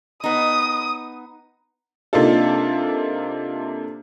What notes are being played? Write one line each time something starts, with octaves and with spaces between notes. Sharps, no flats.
B3 D#4 D#6
C3 A#3 D4 D#4 F4 A4